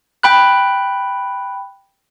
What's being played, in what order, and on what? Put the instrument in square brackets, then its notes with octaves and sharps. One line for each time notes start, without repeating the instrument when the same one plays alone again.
[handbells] G5 B5 F#6